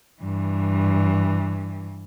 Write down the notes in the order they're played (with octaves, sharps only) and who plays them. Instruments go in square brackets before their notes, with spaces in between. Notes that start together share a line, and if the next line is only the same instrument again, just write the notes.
[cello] G2 E3